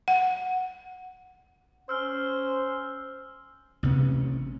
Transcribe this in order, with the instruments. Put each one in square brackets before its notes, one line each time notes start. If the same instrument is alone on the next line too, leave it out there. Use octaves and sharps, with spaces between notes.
[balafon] F#5
[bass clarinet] C#4 [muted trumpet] C5 [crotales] E6 F6 G7
[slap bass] A1 C3 B3 C#4